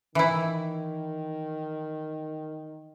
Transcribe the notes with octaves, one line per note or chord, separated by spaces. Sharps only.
D#3 E3 E4